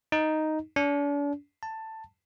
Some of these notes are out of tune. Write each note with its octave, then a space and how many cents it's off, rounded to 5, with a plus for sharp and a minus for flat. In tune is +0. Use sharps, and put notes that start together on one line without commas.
D#4 +0
D4 -40
A5 +10